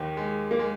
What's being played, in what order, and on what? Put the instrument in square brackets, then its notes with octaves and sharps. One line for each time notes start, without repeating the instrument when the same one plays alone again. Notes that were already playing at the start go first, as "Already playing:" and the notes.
Already playing: [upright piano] D#2 D#3
G#3
A#3
G#3